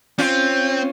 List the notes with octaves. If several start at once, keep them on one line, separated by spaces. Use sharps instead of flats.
C4 C#4 F4